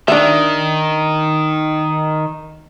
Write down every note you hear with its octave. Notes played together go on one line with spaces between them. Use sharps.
D#3 D4 E5